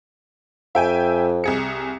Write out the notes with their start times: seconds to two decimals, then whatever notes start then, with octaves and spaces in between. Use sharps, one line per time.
0.75 F2 E5 G5 G#5
1.44 C2 G#4 C#7